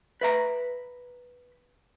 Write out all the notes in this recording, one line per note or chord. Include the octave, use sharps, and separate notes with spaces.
B4 E5 A#5